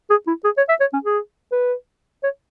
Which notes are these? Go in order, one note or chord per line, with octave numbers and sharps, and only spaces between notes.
G#4
E4
G#4
C#5
E5
C#5
C#4
G#4
B4
C#5